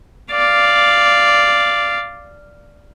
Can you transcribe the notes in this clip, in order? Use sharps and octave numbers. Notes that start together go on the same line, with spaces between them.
D5 F5